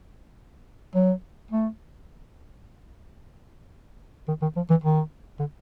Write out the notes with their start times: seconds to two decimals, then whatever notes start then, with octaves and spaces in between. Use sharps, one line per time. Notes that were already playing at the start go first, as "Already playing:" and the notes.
0.95 F#3
1.51 A3
4.28 D#3
4.42 D#3
4.56 F3
4.70 E3
4.84 D#3
5.40 D3